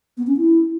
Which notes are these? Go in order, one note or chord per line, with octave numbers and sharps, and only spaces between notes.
B3
C#4
E4